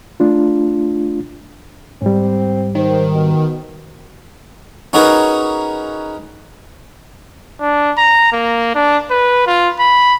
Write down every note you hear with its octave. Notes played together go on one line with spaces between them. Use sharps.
A3 D4 F4
G#2 G3 C4
D#3 C5
B2
C#4 D#4 F#4 G#4 A#4 B4
D4
A#5
A#3
D4
B4
F4
B5